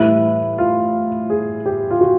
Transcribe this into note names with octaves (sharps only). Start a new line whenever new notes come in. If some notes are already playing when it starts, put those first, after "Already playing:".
Already playing: A2 E3 G3 E4
F4
G#4
G4
F4
F#4